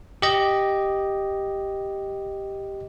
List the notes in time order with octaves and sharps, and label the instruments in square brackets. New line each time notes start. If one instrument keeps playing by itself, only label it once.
[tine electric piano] G4 D#5